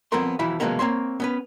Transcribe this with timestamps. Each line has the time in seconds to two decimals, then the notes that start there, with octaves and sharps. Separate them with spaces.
0.12 F3 B3 C4 A4 A#4 C6
0.39 B1 E3 F3 E4 B5
0.60 C3 F3 F#3 G#3 A#3 B3
0.79 A#3 C4 C#5 C6
1.20 B3 C#4 B4